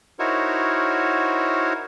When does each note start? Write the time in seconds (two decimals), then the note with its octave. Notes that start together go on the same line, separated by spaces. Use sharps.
0.19 D#4 E4 F#4 A#4 C5 C#5